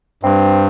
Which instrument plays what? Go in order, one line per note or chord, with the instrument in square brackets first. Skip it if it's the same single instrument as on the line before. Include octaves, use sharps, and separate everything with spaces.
[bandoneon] G2 [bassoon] C4